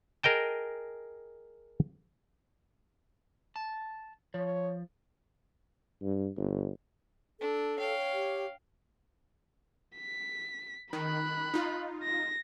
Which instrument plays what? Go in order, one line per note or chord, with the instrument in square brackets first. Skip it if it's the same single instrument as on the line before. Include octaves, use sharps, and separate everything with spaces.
[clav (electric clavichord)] G#4 A#4 D#5 G5 A5
[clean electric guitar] A5
[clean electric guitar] F3 [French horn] C#5
[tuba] G2
G1
[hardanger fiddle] D4 [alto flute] A4
[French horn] C#5 [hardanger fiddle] F5 G5
[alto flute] G4
[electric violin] B6
[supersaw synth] D#3 [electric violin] B5 F#6
[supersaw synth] D#4 F4
[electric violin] A#6